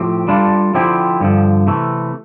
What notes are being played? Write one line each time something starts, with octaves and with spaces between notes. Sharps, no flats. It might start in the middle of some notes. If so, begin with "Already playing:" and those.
Already playing: A2 F3 C4 G4
G3 D4 F4 A4
D3 F3 C4 E4 G4
G2 D3 F3
C3 E3 A3